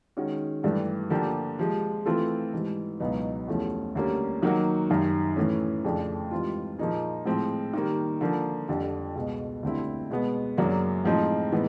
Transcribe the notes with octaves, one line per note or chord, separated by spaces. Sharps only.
D#3 G#3 C#4 F#4
G2 E3 A3 D4 G4
D3 F3 A#3 D4 G4
C3 F3 G#3
E3 A3 C4 F4 A4
G#2 E3 G3
C#2 B2 F#3 B3 D#4
E2 C3 F3 A3 C#4
D2 D3 G3 A#3 C#4
D#3 F#3 A#3 D#4 F#4
F#2 D#3 G3
A2 E3 A3 C#4
F2 C#3 F3 A3 D4
G#2 E3 G3 C4 F4
A#2 F3 A#3 D#4 G#4
A2 F3 G#3 C4
D#3 G3 A#3
D3 F3 A#3
F2 D3 G3
C#2 B2 G#3
D2 D3 G3 C4 E4
B2 G#3 B3
F#2 C#3 F#3 A#3 D4
A2 F3 G#3 C4 D#4
A2 E3 G#3 B3 D#4